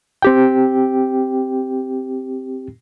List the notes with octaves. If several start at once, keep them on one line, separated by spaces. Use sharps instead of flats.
C4 G4 G5